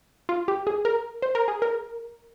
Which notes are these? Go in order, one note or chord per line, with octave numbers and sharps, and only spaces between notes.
F4
G4
G#4
A#4
C5
A#4
G#4
A#4